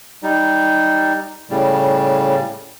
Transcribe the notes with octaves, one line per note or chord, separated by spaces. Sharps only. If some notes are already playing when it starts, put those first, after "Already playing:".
G3 D#4
A2 C#3 G3